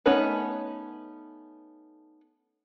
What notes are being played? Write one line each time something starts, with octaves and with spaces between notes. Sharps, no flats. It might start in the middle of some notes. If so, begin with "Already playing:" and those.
A3 B3 C#4 D#4 B4